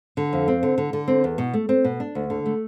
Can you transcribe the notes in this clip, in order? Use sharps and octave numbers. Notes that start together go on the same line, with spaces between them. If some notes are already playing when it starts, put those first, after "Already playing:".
D3
F2
C4
D3
D3
D3
C4
E2
B2
A3
C4
B2
D4
D2
D3
A3